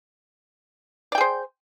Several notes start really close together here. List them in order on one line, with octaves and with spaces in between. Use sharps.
D5 G5 G#4 C5